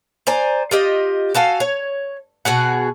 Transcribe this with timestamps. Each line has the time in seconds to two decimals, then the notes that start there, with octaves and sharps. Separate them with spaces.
0.27 C5 D5 G#5 A#5
0.71 F4 G4 D#5
1.35 F#4 A4 F5 G#5
1.60 C#5
2.45 B2 F#4 G#4 F#5